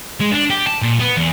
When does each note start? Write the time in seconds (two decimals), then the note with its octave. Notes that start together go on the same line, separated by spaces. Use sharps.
0.20 G#3
0.32 D4
0.50 G4
0.67 A5
0.82 A#2
1.00 B3
1.17 E2